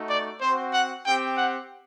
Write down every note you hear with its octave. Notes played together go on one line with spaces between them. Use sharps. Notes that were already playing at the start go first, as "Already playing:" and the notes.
Already playing: A3 D#4 F#4
D5
C4 F#4 C5
F#5
C4 G4 G5
F#5